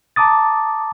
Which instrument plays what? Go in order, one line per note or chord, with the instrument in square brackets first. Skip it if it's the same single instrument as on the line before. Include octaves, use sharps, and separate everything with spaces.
[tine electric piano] A5 A#5 D6 D#6 A6